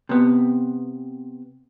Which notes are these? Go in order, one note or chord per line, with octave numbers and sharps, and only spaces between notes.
C3 B3